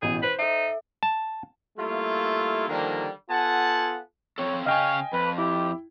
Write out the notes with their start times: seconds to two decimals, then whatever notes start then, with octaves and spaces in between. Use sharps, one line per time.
0.02 A1 B2 E3 G#4 G6
0.23 B4 C5
0.39 D#4 A4 E5
1.03 A5
1.78 G3 A3 A#3 E4 F4
2.68 D3 D#3 F3 G3 A#3
3.29 B3 F4 A4 F#5 G#5 A5
4.38 F3 C4 A4 C#5
4.66 C#3 C#5 D#5 F5 G5 G#5
5.13 F2 B4
5.38 E4 G4 G5